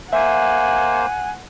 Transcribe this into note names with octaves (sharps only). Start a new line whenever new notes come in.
A#3 C5 E5 F#5 G#5